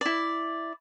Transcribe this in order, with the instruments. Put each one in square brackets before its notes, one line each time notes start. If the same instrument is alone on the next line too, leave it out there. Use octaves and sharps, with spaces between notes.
[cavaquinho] E4 D5